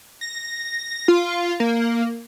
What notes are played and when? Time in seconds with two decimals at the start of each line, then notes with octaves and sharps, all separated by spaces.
0.21 A#6
1.08 F4
1.60 A#3